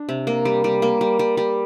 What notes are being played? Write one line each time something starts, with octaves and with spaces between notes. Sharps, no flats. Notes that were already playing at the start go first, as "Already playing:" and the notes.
Already playing: D4
C3
A#3
G3
G3
A#3
G3
G3
G3